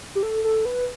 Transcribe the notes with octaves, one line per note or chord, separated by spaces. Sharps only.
G4
A4
A4
B4